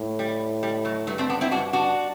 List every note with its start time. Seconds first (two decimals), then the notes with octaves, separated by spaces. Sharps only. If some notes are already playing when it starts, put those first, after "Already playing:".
Already playing: A2
0.19 G3
0.63 G3
0.85 F#3 A3
1.07 G2 F#3 A3
1.18 A3 C4
1.30 B3 D4
1.41 C4 E4
1.51 G2 D4 F#4
1.73 D4 F#4